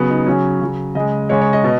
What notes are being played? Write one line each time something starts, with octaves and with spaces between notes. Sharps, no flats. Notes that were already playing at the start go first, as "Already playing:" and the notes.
Already playing: C#3 F#3 B3
D#4
C#3 F#3 C#4
C#3 F#3
C#3 G#3 D#5
C#3 G#3 C#5
C#5
D#5
B2